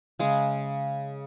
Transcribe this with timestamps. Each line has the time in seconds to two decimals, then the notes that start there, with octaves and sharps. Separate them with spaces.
0.19 C#3 G#3